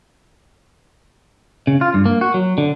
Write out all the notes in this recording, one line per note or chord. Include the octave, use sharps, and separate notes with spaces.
C#3
F4
G2
A#3
F#4
F#3
D3